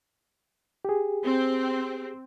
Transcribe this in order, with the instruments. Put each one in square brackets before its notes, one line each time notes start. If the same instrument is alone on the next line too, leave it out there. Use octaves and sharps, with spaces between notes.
[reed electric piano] G4 G#4
[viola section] C4